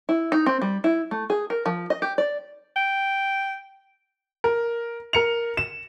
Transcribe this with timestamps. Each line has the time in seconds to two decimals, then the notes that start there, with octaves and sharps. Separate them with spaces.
0.09 E4
0.32 D#4
0.46 C4
0.62 G3
0.84 E4
1.11 A3
1.30 G#4
1.50 A#4
1.66 F3
1.90 D#5
2.02 G4
2.18 D5
2.76 G5
4.44 A#4
5.13 A#4 C#7 F7
5.57 E7